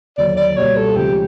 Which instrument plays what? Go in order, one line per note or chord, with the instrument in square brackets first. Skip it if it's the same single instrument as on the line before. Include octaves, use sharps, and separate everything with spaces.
[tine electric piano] D#2 D3 F#3 [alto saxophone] D5
[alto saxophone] D5
[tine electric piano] C#2 B2 G3 A#3 [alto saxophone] C#5
[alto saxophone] A4
[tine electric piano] D2 C#3 F3 G#3 [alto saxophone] G4